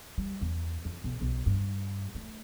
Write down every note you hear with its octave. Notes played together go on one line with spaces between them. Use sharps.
G3
E2
F2
B1
B1
G2
A3